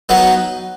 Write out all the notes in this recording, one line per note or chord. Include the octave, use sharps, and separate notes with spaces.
F#3 B3 D#4